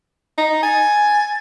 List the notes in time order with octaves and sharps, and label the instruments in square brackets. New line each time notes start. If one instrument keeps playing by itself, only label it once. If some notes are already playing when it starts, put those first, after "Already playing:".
[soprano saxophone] D#4
[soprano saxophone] G#5 [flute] A6